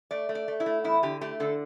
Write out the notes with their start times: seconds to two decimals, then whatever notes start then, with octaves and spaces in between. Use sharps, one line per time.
0.11 A3 D5
0.29 A3
0.35 D5
0.48 A3
0.60 E4
0.66 A3
0.84 E2 E4
1.03 D3 G4
1.21 A3 G4
1.40 D3 A4